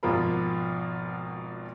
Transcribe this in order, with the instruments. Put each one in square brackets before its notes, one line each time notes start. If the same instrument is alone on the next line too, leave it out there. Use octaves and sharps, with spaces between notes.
[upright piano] G#1 B2 F3 F4 A#4 B5